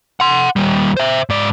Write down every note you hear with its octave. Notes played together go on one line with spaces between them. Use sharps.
F#5 C6
D#2 G3
C5 E5
G#2 D5